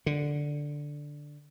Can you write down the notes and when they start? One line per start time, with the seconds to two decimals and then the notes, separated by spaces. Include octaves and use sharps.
0.06 D3